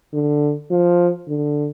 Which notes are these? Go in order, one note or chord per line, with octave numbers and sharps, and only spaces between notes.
D3
F3
D3